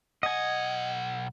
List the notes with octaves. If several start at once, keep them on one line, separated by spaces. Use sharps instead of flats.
B1 D#5 F#5 G#5